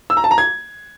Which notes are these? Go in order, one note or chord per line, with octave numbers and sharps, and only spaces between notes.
E6
A#5
A5
A#5
G#6